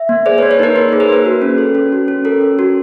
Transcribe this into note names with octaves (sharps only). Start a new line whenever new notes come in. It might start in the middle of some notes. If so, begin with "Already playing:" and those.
Already playing: E5
A#3
G#4 C5 D5
B4 C#5
A#3
B4 C#5
D#4 A#4 C5
A#3 B4
G#4 B4
A#4 C5
A#3 B4
F#4 B4
C#4
A4
C#4
F#4
C#4
A4 A#4
C#4
F#4